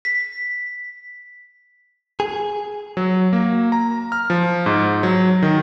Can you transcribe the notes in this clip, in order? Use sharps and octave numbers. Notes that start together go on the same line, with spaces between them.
B6
G#4
F#3
A#3
A#5
F6
F3
G#2
F#3
D#3